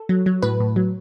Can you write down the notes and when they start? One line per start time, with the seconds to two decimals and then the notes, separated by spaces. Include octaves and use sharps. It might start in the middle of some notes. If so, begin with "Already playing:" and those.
Already playing: A4
0.09 F#3
0.26 F#3
0.42 A2 B4
0.60 A2
0.76 F#3